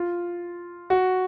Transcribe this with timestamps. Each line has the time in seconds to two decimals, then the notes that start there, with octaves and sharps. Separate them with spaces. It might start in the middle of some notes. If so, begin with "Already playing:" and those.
Already playing: F4
0.90 F#4